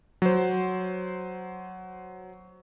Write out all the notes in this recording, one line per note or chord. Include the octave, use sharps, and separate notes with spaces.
F#3 C5